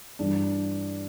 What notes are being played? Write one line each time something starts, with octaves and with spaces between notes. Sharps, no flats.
G2 E3 G3 D4